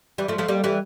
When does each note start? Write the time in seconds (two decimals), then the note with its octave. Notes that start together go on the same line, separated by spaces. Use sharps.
0.18 E3 G3
0.28 F3 A3
0.38 F3 A3
0.48 G3 A#3
0.64 E3 G3